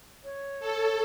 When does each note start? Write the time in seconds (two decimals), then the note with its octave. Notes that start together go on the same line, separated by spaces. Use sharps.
0.24 C#5
0.60 A4